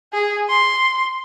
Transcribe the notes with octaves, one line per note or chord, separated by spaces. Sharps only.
G#4
C6